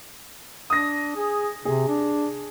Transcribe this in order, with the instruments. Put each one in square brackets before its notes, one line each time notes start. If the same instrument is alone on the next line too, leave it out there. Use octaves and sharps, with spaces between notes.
[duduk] D4 [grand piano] D#6 A#6
[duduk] G#4
[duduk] C3 [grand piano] G#4
[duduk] D4